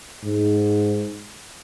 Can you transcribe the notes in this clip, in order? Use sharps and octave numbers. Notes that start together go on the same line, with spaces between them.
G#2